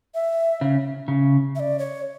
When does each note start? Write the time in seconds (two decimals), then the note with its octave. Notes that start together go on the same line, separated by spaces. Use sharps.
0.14 E5
0.61 C#3
1.08 C#3
1.55 E5
1.60 D5
1.79 C#5